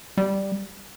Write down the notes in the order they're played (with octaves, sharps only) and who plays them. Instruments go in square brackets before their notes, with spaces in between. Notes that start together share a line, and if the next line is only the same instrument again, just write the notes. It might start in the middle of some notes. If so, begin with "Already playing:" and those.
[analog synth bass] G3